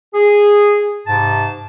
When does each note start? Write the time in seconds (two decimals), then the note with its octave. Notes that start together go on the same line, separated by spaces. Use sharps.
0.14 G#4
1.07 G#2 C3 A5